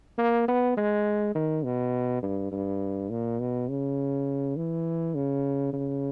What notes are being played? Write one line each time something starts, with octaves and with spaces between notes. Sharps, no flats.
A#3
B3
G#3
D#3
B2
G2
G2
A#2
B2
C#3
E3
C#3
C#3